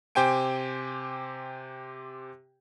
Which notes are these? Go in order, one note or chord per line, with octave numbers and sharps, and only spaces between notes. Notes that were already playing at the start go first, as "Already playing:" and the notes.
C3 G4 C5 G5 G#5 D7